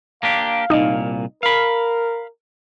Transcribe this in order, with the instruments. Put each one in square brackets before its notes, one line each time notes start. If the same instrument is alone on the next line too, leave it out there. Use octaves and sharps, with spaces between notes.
[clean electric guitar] A#3 D4 G4 [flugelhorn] F5
[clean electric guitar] C2 A#2 [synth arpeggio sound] D#4 D#5
[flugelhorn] A#4 [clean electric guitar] F5 B5